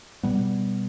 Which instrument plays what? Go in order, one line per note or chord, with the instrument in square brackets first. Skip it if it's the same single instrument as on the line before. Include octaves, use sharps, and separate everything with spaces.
[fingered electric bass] B2 G3 B3